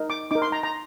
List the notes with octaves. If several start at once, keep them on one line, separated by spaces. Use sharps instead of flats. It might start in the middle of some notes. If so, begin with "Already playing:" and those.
Already playing: D#4 A#4
D6
D#4 A#4 D6
C6
A#5
A#5